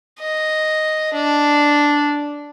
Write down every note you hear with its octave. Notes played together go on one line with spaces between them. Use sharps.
D#5
D4